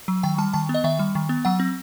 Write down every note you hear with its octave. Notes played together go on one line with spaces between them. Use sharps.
F#3
D#3 G5
G3 A5
D#3 A5
B3
D#5
D#3 E5
G3
D#3
B3
F#3 F#5
C4